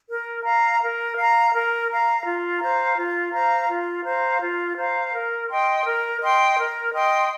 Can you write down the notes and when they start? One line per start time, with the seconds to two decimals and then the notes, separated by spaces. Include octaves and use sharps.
0.08 A#4
0.44 F5 A#5
0.81 A#4
1.16 F5 A#5
1.52 A#4
1.88 F5 A#5
2.25 F4
2.60 C5 F5 A#5
2.96 F4
3.33 C5 F5 A#5
3.68 F4
4.04 C5 F5 A#5
4.40 F4
4.77 C5 F5 A#5
5.13 A#4
5.49 D#5 G5 C6
5.85 A#4
6.21 D#5 G5 C6
6.57 A#4
6.93 D#5 G5 C6